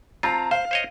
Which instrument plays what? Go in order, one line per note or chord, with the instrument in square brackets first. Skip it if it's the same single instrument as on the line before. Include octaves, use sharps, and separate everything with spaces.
[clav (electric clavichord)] C4 F4 [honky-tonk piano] A5 A#5
[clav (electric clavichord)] C5 [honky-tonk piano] F5
[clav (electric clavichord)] C5 C#5 D#5